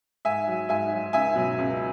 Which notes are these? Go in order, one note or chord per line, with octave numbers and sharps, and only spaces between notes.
G#2 E5 G#5
F#3
G#2 E5 G#5
F#3
C#2 E5 G#5
B2 F#3
C#2